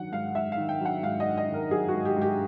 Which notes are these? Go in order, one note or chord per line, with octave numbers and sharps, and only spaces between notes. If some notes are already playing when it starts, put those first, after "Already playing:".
Already playing: D#3 F#3 F#5
G#2 F5
G#2 E5
F5
D#3
G5
F#3 F#5
G#2 F5
D#5
G#2
D#5
D#3
A#4
F#3 G#4
F#4
G#2
G4
G#2
G4